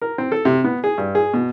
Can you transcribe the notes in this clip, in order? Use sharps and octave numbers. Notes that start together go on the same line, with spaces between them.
A#4
C4
A4
C3
B3
G#4
G2
G#4
B2